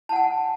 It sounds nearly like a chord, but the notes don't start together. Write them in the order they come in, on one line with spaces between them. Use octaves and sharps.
A5 F#5 G#5